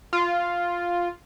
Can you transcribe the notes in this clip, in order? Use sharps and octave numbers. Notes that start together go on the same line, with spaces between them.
F4